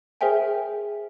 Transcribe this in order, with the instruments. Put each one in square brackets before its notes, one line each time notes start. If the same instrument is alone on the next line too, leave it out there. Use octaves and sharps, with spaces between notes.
[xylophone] G#4 A#4 C5 E5 G5 G#5